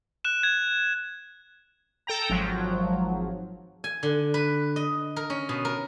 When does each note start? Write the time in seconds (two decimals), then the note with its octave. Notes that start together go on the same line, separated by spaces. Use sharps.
0.25 F#6 E7
0.43 G#6
2.07 A4 G5 A#5
2.30 G#1 F3 F#3
3.84 G#5
4.03 D3
4.34 B4
4.76 D#5
5.16 A#4
5.30 C#4
5.49 B2
5.65 A#4